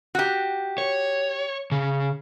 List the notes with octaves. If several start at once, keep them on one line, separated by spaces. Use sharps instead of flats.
F#4 G4
C#5
C#3